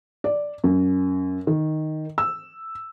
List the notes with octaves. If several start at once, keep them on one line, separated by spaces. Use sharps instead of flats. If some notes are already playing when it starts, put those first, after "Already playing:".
D5
F#2
D#3
E6